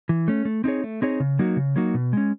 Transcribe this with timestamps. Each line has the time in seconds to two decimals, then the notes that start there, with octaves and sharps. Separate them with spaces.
0.09 E3
0.28 A3 C#4
0.45 A3
0.64 C4 D#4 G#4 C#5
0.84 A3
1.02 C4 D#4 G#4 C#5
1.20 C#3
1.39 F#3 A#3 D#4 F#4
1.57 C#3
1.76 F#3 A#3 D#4 F#4
1.94 B2
2.13 G#3 C#4